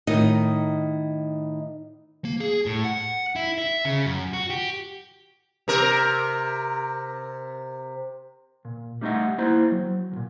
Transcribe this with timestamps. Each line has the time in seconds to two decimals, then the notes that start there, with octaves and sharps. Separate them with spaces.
0.07 A2 D#3 D#4 D#5
2.25 A#3
2.40 G#4
2.66 A2
2.84 F#5
3.36 E4
3.58 E5
3.85 C#3
4.06 F#2
4.33 F#4
4.50 G4
5.68 C3 A#4
8.65 A#2
9.01 G3 A3 D#4 D5 D#5 F#5
9.38 A#3 E4 C5 A#5
9.72 F#3
10.12 D2 A#2